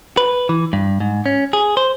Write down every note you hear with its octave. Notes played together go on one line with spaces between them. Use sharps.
B4
E3
G2
G#2
C#4
G#4
C5